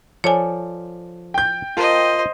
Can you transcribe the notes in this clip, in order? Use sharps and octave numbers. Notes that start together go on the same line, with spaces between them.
F3 A4 C#5 D5 G#5
G5 G6
F4 A#4 C5 D#5 A5